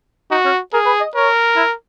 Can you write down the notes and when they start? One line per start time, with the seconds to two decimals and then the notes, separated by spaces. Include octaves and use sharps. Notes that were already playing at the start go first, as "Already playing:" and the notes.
0.31 D#4 F#4
0.45 C#4
0.73 G#4 A#4
0.86 B4
1.01 D#5
1.15 A#4 C#5
1.56 E4